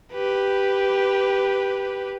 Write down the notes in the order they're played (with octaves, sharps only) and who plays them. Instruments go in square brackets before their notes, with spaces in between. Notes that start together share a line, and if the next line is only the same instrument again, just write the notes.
[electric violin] G4 B4